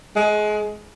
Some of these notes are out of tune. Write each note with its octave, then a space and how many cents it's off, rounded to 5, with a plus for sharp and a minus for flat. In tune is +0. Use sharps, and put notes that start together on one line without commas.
G#3 +25